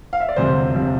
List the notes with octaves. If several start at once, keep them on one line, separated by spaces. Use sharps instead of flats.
F5
E5
D5
E1 D2 C3 F3 C5
C3 F3